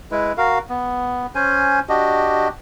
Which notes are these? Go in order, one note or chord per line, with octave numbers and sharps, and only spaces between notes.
G#3 E4 B4
F#4 A#4 F5
B3
C#4 C5 G#5
D4 F#4 G4 D#5